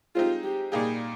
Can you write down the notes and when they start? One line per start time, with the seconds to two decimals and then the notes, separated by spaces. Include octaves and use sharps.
0.15 G#3 C4 D#4 F4 G4
0.44 G4
0.72 A#2 G3 A#3 D#4 G4 G#4